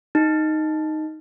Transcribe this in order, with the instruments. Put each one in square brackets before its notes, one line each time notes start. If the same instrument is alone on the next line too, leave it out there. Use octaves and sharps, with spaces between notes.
[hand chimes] D#4